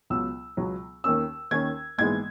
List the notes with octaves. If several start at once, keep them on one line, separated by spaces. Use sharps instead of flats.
C#2 B2 F#3 B3 E6
C#2 B2 F#3 B3
D#2 D#3 A#3 C#4 E6
D#2 D#3 A#3 C#4 G#6
A#1 G#2 E3 G#3 B3 G#6